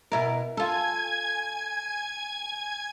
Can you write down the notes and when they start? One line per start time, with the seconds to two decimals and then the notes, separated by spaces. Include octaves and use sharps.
0.12 B2 E4 A#4
0.57 F4 A4 G#5 G#6